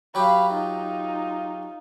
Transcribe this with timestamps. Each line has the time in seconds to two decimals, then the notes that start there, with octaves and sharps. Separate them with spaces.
0.15 F#3 G4 F5 B5
0.53 D#4 F4